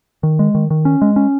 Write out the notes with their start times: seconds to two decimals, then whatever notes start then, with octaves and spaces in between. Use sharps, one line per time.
0.23 D#3
0.39 G#3
0.55 D#3
0.70 D#3
0.85 C#4
1.02 G#3
1.16 C#4